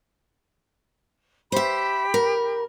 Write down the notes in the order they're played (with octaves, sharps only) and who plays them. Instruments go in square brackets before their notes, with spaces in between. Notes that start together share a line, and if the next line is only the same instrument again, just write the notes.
[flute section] G4 B5 [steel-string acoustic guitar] C5 E5
[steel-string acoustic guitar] A#4